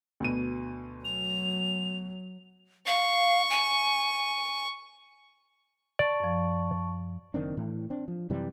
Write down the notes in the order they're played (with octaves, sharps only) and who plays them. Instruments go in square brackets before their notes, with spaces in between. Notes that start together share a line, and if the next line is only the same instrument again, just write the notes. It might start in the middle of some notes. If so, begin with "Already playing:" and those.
[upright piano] D2 B2 D#7
[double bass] F#3 [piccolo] F7
[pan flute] F5 [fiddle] C#6
[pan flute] G#5
[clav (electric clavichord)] D5 [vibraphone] A5 C#6
[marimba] F#2 F3
[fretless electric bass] F#1 D#3 C4 D4
A2 E3
C4 D4
F3
F#2 C3 E3 G3